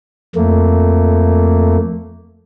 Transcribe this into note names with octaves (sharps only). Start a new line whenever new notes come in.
F2 A3 A#3